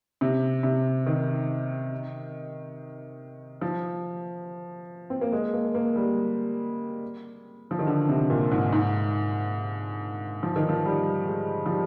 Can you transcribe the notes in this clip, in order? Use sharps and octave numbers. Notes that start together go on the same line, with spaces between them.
C3
C3
D#3
F3
C4
A#3
G#3
A#3
A#3
G3
F3
D#3
D3
C3
A#2
G#2
G#2
F3
D#3
F3
G3
G#3
F3
G3